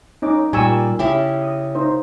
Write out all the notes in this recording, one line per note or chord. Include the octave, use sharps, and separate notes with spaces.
C#4 D#4 D6
A#2 G3 G#5 C#6 E6
C#3 E4 G4
D#6
D#4 C5